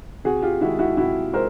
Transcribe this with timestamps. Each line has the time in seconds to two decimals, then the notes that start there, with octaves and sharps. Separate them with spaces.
0.24 C3 F#4 G#4
0.42 F4 G4
0.61 D#3 G#3 E4 F#4
0.79 E4 F#4
0.97 C3 E4 F#4
1.34 G#3 A#4 C5